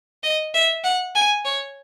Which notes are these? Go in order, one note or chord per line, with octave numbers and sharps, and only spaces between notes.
D#5
E5
F#5
G#5
C#5